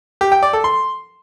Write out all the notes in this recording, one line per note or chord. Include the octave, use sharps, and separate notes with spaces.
G4
G5
D5
A4
C6